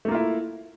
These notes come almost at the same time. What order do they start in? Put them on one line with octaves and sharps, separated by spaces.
A3 A#3 F4 E4